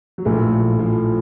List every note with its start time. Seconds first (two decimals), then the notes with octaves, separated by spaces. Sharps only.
0.18 F#3
0.25 A#1 A2 F3 A3
0.77 A#1 A2 F3